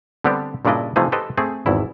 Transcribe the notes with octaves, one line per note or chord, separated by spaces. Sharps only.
D3 G3 B3 C4 D4 G4
G2 A#2 C#3 D4 E4 D#5
C3 E3 F3 A3 D#4 G#4
G4 A4 B4 C5 D#5
A3 C4 G#4
G#1 E2 E4